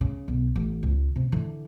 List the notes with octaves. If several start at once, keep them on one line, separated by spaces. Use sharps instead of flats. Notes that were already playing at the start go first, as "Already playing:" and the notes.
C#3
B1
A1
C#2
C3
D3 E3